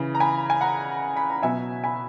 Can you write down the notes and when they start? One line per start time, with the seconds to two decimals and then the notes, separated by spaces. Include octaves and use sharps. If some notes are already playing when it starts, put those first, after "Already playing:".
Already playing: C#3 E3
0.15 A#5
0.20 G#5 B5
0.50 G#5
0.61 F#5 A#5
1.17 B5
1.30 A#5
1.43 B2 F#3 E5 G#5
1.84 G#5 B5